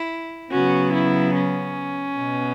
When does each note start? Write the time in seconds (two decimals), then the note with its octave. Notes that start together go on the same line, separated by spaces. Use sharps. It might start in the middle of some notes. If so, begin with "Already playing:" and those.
Already playing: E4
0.52 C#3 F#3 B3 C#4 F#4
0.93 E4
1.35 C#4
2.18 B2 B3